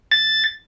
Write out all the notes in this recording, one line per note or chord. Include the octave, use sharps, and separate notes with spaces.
A6